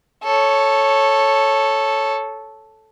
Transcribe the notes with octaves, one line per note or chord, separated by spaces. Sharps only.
A4 C#5